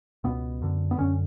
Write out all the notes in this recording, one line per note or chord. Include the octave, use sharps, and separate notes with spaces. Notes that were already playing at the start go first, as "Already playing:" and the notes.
C#2 B2 B3
F#2 D3
B3
F#2 D3 C#4